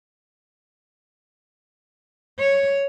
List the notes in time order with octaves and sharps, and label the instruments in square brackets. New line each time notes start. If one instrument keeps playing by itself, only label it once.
[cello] C#5